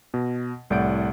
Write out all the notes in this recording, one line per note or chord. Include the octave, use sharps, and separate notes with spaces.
B2
C2 A2 D5 F#5 G6 D7